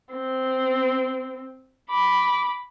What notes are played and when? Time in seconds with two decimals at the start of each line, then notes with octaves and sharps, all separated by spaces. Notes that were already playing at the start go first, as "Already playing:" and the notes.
0.13 C4
1.90 B5 D6